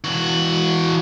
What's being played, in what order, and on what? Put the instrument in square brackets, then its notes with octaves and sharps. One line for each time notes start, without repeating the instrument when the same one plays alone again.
[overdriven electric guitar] E3 F#4